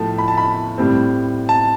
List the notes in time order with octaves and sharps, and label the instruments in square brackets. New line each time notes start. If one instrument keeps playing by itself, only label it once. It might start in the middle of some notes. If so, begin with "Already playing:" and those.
Already playing: [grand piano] A2 F3 A3 A5
B5
A5
B5
A2 G3 C4
A5